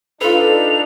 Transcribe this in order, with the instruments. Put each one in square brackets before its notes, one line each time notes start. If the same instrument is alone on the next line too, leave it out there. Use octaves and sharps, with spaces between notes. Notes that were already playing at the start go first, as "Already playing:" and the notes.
[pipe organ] D4 D#4 [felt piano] F4 B4 [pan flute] A4 [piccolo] F7